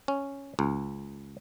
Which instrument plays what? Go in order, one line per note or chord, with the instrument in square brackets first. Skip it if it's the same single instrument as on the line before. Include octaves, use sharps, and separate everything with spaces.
[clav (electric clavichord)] C#4
C#2